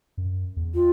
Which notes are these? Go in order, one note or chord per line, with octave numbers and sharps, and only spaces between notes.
F#2
E2
F4